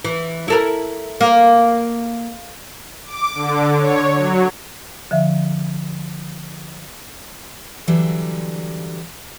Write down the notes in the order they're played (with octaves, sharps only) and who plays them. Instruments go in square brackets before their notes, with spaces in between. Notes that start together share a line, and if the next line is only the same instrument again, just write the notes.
[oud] E3
E4 A4 A#4
A#3
[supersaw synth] D6
D3
C#5
F#3
[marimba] D3 F3 E5
[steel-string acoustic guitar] D3 E3 F#3 G3